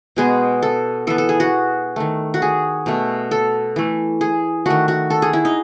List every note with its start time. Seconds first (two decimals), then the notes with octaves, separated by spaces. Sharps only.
0.16 B2 G#3 B3 G#4
0.63 A4
1.07 E3 B3 A4
1.18 A4
1.29 G#4
1.40 F#4
1.96 D#3 A3
2.34 F#4
2.42 G#4
2.86 B2 A3
3.31 A4
3.76 E3 A3
4.21 G#4
4.66 D#3 A3 F#4
4.88 F#4
5.10 A4
5.22 G#4
5.33 E4
5.45 D#4